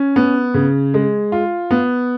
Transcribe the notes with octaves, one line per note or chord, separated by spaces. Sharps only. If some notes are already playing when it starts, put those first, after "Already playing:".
Already playing: C#4
B3
C#3
G#3
F4
B3